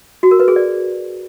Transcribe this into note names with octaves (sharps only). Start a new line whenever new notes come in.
F#4
A#4
B4
G#4
D5